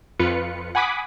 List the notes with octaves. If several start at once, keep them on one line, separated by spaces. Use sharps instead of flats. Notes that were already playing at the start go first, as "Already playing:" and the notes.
F2 F4 B4 C#7
F#5 G#5 B5 D6 D#6 B6